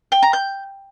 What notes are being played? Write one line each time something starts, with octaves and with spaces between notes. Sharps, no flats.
G5
A#5
G6